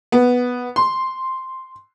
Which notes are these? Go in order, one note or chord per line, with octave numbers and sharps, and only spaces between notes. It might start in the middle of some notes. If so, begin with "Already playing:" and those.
B3
C6